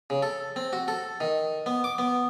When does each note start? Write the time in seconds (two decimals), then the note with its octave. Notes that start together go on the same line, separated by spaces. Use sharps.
0.10 C#3
0.23 A4
0.56 C4
0.73 F#4
0.88 A4
1.21 D#3
1.66 B3
1.84 D6
1.98 B3